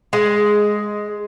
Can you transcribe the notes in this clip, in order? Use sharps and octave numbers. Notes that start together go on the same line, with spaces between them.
G#3